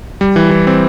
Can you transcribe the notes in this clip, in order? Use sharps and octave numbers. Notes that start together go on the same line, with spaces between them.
G3
E3
E3
C4